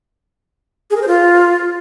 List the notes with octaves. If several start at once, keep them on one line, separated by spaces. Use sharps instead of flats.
G#4
A#4
C5
F4